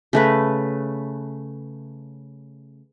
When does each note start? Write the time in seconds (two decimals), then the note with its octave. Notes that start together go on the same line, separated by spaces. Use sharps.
0.13 C#3 A3 B4